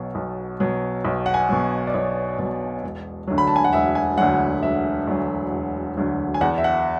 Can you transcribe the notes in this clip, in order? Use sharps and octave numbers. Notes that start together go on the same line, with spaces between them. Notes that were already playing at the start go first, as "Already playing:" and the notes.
Already playing: B1 B2 F#3
B1
B2 F#3
B1
F#5
G#5
B2 F#3
D5
B1 C#5
B2 F#3
E1
D2 D3 F#3
B5
A5
G#5
F#5
E1 E5
G#5
D2 D3 F#3 F#5
E1 E5
D2 D3 F#3
E1
D2 D3 F#3
G#5
E2 F#5
E5
F#5